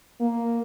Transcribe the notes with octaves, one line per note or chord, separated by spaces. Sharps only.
A#3